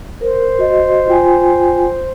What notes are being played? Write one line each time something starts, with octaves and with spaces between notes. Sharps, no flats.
A#4 C5
F#4 D#5
F4 G5 G#5